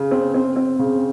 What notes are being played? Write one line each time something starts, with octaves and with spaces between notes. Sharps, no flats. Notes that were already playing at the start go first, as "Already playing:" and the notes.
Already playing: C#3
C4
C4
C4
C#3